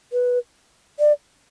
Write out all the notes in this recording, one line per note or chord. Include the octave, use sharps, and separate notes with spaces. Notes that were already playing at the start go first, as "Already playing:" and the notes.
B4
D5